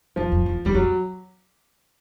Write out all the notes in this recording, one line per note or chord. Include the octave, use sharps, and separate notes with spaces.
F#2 F3
F2
E2
E2 G3
F2 F#3